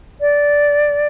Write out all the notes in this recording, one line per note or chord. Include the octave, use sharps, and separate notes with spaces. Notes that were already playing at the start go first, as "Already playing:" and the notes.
D5